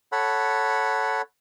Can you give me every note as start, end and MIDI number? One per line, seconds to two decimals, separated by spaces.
0.12 1.22 69
0.12 1.22 73
0.12 1.22 78
0.12 1.22 83